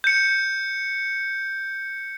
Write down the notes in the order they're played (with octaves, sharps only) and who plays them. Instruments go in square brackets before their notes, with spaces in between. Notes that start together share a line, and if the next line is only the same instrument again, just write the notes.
[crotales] G6 C#7